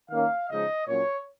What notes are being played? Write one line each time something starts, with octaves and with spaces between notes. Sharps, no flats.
D#3 A#3 C#4 F5
C#3 F3 G#3 D#4 D#5
A#2 F#3 C#4 C#5